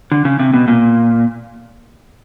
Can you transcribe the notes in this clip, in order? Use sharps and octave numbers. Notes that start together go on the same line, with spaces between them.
D3
C#3
C3
B2
A#2